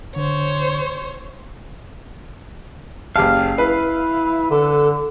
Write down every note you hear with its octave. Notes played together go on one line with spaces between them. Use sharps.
D3 C5 C#5
F#1 G4 F5 A5
E4 B4
D3 A4